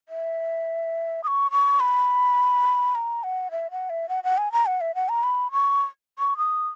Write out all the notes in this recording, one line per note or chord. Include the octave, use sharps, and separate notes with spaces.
E5
D#6
C#6
C#6
B5
A#5
F#5
E5
F#5
E5
F#5
F#5
G#5
A#5
F#5
E5
F#5
A#5
B5
C#6
C#6
D#6